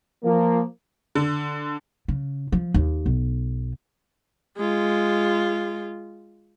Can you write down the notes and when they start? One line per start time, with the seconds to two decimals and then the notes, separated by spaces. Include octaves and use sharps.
0.23 F3 A#3
1.15 D3
2.08 C#3
2.52 F3
2.74 D#2
3.06 B1
4.57 G#3 F4